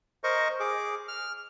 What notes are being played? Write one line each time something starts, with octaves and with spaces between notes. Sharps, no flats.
A#4 C5 D#5 C#6
G#4 D6
F6